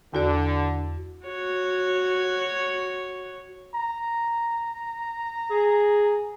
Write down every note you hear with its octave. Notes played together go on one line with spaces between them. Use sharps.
E2 D3 F#4 D5
F#4 C#5
A#5
G#4